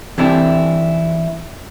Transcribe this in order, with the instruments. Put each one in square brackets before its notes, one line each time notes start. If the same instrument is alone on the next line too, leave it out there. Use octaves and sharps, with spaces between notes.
[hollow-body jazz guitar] E3 C4 D4 E4 G4 A4